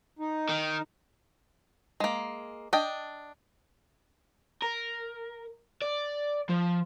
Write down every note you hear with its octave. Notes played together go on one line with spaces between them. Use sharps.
D#4
D#3
G#3 A#3
D4 D#5 G5
A#4
D5
F3